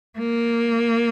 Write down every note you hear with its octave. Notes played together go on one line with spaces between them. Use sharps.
A#3